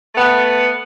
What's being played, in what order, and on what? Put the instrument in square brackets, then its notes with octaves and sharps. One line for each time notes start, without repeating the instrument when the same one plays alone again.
[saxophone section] A3 B3